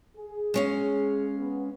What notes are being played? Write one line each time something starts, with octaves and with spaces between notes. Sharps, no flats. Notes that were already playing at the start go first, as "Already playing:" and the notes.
G#4
G#3 C#4 F5
B3